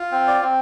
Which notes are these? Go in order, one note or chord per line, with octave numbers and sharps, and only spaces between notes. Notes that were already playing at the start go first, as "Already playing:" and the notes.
Already playing: F4
C4
D5
C4